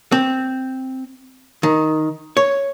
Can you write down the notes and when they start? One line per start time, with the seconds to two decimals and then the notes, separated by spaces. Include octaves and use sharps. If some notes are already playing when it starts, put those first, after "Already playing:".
0.12 C4
1.63 D#3
2.37 C#5